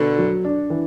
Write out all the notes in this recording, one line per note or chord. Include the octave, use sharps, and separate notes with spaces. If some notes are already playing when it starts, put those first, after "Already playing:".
Already playing: B2 D3
F#3
D4
E3